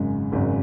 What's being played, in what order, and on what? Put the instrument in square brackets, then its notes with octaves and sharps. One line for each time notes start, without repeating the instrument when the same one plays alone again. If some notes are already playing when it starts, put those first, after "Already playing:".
Already playing: [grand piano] G#1 F#2 C#3 G#3
G#1 F#2 C#3 G#3